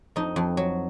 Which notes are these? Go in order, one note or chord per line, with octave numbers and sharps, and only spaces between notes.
F2 D#4
F2
F#3